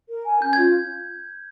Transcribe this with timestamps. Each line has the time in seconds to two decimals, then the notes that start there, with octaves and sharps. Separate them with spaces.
0.08 A#4
0.26 G#5
0.42 C#4 G6
0.53 G#6
0.58 F4